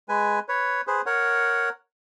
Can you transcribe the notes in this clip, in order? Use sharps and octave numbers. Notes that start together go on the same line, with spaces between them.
G#3 B4 G#5
B4 C#5
G#4 B4 C5
A#4 C#5 F#5